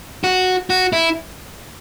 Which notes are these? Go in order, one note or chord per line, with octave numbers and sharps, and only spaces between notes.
F#4
F#4
E4